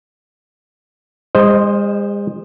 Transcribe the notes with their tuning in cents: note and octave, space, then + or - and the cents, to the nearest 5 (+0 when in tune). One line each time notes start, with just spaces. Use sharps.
G#3 -45 C5 +0 D#5 +0